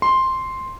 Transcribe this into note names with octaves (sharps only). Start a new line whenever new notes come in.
C6